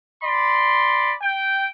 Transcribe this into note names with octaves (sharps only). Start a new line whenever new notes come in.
D5 B5 C6
G5